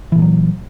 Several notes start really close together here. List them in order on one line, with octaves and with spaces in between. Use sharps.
E3 A#2 A3 F#3